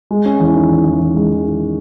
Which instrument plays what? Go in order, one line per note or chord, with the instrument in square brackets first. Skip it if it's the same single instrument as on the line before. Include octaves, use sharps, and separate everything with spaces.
[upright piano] G#3
C#4
E2
D#3
E2
E2
E2
G#3
E2
D#3